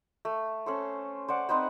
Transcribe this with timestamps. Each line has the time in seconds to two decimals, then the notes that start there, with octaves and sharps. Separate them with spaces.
0.25 A3
0.66 C#4 A4 C5
1.28 C5 D5 F#5
1.49 C4 D#4 B4 C5